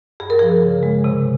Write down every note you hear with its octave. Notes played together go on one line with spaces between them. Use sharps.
G2 G#4
A#4
F3 G#4
C#3
G#3
C3